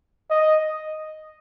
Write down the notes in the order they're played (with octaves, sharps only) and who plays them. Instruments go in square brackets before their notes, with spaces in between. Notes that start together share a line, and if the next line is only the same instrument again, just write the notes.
[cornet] D#5